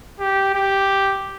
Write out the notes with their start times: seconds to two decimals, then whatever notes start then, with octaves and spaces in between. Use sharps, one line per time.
0.20 G4
0.54 G4